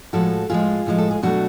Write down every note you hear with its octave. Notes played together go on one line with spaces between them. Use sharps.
A2 F3 G#3 F#4 A4
A2 F3 G#3 F4 G#4
A2 F3 G#3
A4
G#4
B2 F#3 A3 D4 F#4